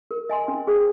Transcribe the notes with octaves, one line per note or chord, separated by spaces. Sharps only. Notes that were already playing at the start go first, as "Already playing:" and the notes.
A#4
D#5 G#5 C6
C#4
G#4 C5